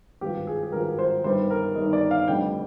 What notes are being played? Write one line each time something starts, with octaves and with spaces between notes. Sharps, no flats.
G#1 G2 F3 G4
G#4
G#4
G#1 G2 F3 A#4
C5
G1 G2 D#3 G3 C5
A#4
G1 G2 D#3 G3 D#5
D5
F5
F1 F2 D3 G3 G5